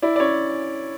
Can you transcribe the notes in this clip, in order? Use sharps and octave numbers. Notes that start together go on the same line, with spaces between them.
E4 D5
D5
C#4 C#5